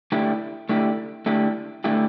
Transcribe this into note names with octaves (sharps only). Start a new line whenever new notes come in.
D3 A3 E4 G4
D3 A3 E4 G4
D3 A3 E4 G4
D3 A3 E4 G4